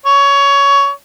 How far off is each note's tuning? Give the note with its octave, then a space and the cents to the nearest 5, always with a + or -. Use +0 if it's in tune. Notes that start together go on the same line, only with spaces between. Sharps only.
C#5 +20